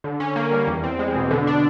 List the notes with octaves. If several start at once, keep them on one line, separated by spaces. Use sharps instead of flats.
D3
C#4
A#3
G3
E2
C4
G#3
B2
D3
D4